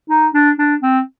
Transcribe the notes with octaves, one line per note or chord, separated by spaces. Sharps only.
D#4
D4
D4
C4